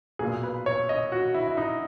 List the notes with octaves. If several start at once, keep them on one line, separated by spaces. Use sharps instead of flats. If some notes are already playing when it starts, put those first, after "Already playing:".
B1 A#2 G#4
B4
C#5
D#5
F#4
E4
E4
D#4